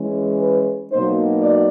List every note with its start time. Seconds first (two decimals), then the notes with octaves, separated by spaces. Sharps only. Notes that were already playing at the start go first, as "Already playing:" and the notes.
Already playing: E3 G#3 C#4
0.41 B4
0.91 B2 F#3 A#3 D#4 C5
1.40 D5